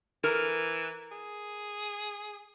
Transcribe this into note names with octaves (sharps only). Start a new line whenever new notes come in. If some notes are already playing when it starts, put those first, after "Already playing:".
E3 A#4
G#4